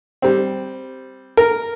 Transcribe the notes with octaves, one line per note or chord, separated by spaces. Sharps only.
G3 C4
A#4